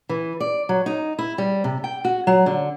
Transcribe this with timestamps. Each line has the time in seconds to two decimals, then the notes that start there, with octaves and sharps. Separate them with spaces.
0.09 E3
0.40 D5
0.69 F#3
0.86 D#4
1.19 E4
1.38 G3
1.64 C3
1.84 G5
2.05 F#4
2.27 F#3
2.46 D3